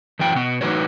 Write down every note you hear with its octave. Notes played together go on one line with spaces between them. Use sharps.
F#2 E3 F#3 G5
B2 B3
A2 E3 D#4 F#4 B4 C#5